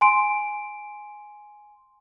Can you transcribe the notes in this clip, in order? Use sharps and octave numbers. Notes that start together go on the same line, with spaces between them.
G#5 C6 D7